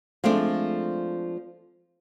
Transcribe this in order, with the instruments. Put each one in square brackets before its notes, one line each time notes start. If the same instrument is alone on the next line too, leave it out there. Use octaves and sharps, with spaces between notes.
[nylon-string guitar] F3 G#3 A3 C4 D4